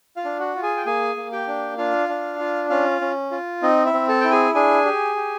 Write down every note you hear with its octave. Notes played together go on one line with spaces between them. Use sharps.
F4 F5
D4
F#4 F#5
F4
G#4 G#5
G5
A#3 G#4 G#5
A#3
G4 G5
D4
D4 F4 F5
D4
F4
C#4 F4 F5
C#4
F4
C4 D#4 D#5
E4 E5
C4
A4 A5
E4 G5
G#4 G#5
D4 G#4 G#5
G4
G4